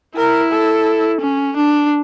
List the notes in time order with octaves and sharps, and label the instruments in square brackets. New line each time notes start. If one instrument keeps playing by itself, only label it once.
[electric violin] E4 [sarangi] A#4
[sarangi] A4
[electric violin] C#4
D4